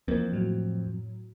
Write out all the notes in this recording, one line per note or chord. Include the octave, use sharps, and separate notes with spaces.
F2 E3 F3 A#3
A2 F#3